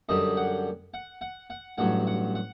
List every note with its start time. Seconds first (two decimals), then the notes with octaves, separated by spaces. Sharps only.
0.09 F#2 D3 G3 D#5
0.37 F#5
0.94 F#5
1.21 F#5
1.50 F#5
1.78 A1 G2 F#3 F#5
2.07 F#5
2.35 F#5